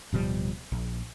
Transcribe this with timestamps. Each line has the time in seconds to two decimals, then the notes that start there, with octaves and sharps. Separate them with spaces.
0.13 D1 B2 F3 G3
0.72 A#1